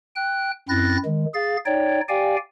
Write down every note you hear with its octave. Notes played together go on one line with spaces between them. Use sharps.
G5 F#6
F#2 C4 E4 F#6 A6 A#6
D#3 G#3
G#4 F5 A6
D#4 C#5 D5 G5
G4 D5 F5 G5 G#5